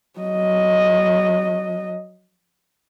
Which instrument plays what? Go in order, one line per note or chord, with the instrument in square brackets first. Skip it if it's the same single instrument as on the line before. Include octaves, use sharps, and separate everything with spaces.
[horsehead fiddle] F#3 D#5